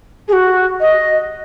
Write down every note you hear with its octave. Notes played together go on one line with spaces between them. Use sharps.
G#4
F#4
D#5